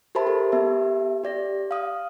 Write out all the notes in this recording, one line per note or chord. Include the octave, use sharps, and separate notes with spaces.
G4 A#4 C5 E5 A5 B5
G4 A4
B3 G4 E5
G4 D5 A#6
F5 D#6